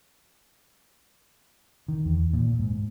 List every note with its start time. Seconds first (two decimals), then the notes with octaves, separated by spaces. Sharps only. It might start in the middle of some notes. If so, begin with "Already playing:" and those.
1.88 D#3
2.05 E2
2.33 A#2
2.59 G#2